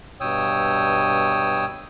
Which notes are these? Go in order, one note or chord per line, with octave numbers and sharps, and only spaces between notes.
G2 B2 C#5 G5 D#6 E6